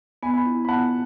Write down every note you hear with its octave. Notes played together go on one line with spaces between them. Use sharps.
B3 G#5 B5
G#5 B5
E4
B5
B3 F#5 A5